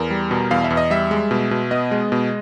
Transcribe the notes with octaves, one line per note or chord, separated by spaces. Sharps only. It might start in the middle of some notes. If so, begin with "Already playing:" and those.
Already playing: E2 A#4
G3
B2
E2 F5
E5
E2
D#5
G3 E5
G#3
B2
B2
B3 D#5
G#3
B2